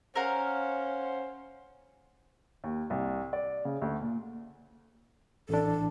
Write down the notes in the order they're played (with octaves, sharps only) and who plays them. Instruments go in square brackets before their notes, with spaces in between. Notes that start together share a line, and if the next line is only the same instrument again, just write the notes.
[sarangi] C#4 [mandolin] A#4 F5 F#5 [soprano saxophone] C5
[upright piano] D#2
C2
D5
C#3
D2
A#2
[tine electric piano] A1 D4 [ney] A4